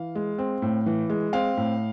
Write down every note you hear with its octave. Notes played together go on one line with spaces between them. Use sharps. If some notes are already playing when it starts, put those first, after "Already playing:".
Already playing: E3 F5
G#3
C4
A2
E3
G#3
C4 F5
A2